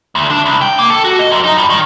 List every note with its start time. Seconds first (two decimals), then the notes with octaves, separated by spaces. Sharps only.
0.15 D2
0.31 D4
0.45 C2
0.61 G5
0.78 A#3
0.90 A4
1.04 F#4
1.19 D#5
1.31 F#2
1.44 D#4
1.57 G2
1.70 D#3